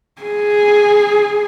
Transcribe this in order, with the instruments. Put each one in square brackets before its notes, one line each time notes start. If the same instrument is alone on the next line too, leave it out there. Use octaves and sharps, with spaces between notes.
[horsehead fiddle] G#4